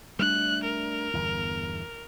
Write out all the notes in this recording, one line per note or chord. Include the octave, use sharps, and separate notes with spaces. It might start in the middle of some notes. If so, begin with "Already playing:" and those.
G3 A3 D4 F#6
A#4
G1 E2